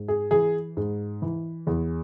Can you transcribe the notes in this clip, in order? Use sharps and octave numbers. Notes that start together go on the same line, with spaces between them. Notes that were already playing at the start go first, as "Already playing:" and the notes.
Already playing: G#2
G#4
E3 G#4
G#2
E3
E2